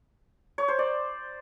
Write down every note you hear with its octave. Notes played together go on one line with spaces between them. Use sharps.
C#5
C5
D5